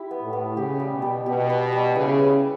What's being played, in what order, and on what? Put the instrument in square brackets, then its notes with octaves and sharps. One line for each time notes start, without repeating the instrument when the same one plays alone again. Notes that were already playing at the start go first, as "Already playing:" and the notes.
Already playing: [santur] E4 G4
B3
[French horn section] A2
[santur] B3
[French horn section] C#3 [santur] G4
[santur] G3
[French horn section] B2
[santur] G3
[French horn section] B2 [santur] G4
[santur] B4
G3
[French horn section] C#3 [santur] E4
[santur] B4